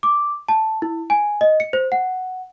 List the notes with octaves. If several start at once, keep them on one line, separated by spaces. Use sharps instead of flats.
D6
A5
E4
G#5
D#5
C#7
C5
F#5